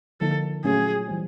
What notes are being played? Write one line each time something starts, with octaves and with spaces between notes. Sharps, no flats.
D3 F3 A#3 D#4 A4
A#2 F#3 A3 C#4 F4 G#4
E3 G3 C4